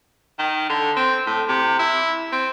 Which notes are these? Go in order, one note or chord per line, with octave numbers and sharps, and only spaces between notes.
D#3
D3
C4
A2
C3
E4
C4